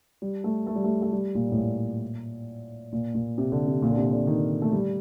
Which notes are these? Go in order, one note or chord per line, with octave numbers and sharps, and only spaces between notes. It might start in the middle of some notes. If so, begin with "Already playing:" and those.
G3
A3
A3
G3
A3
A3
G3
A#2
A2
A#2
A#2
A#2
C3
D3
C3
A#2
D3
C3
D3
D#3
A3
G3